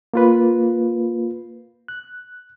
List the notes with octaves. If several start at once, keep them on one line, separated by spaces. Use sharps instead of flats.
A#3 F4 B4
F#6